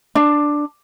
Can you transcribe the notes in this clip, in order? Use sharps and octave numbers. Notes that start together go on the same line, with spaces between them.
D4